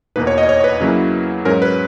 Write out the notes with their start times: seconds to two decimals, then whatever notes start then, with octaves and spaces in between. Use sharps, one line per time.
0.16 E2 B2 A#3 D#4 B4
0.27 C#5
0.38 D#5
0.49 C#5
0.60 C#5
0.64 B4
0.80 C#3 F#3 A#3 C#4 E4
1.45 G#2 F#3 C#4 A#4
1.62 B4